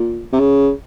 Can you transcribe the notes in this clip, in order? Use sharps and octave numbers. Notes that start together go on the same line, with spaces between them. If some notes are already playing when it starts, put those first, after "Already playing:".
Already playing: A#2
C3
C#3